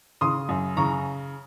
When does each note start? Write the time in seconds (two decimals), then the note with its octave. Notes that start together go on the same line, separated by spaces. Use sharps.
0.21 C#3 C6 D#6
0.49 F#2
0.77 C#3 A#5 C#6